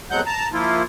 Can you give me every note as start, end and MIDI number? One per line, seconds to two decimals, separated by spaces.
0.11 0.21 41
0.11 0.21 47
0.11 0.21 54
0.11 0.21 56
0.11 0.21 78
0.11 0.21 91
0.26 0.48 81
0.26 0.48 82
0.53 0.83 53
0.53 0.83 58
0.53 0.83 64
0.53 0.83 65